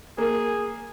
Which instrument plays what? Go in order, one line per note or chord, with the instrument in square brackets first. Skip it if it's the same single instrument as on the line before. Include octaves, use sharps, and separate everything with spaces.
[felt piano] A#3 [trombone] G#4